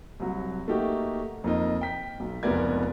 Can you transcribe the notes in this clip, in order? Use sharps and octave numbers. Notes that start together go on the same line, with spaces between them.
C2 F#3
A3 A#3 D#4 F#4 G4
F2 A#3 D#4
G5 B6
B1
F1 C#2 B3 A#4 D5 G#6